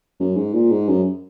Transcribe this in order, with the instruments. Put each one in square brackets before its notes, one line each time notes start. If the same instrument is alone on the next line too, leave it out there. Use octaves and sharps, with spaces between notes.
[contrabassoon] F#2
G#2
A#2
G#2
F#2